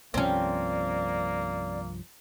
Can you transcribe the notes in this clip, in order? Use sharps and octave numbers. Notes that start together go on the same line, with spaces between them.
C2 G2 F3 A#3 C4 C#4 D5